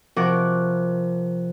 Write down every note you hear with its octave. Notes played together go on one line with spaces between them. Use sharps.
C3 F3 A#4 F#5 C#6 D6